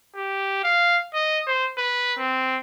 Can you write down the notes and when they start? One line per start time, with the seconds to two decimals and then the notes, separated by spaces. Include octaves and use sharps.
0.16 G4
0.64 F5
1.14 D#5
1.47 C5
1.78 B4
2.19 C4